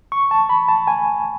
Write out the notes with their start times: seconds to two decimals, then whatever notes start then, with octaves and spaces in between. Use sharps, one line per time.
0.12 C#6
0.31 A5
0.49 B5
0.68 A5
0.87 G#5